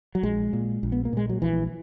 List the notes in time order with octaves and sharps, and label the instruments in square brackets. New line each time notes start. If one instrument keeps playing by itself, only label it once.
[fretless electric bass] F#3
A#1 G#3
A#2
A#1
B3
A#3
A#2 G#3
F#3
A#1 E3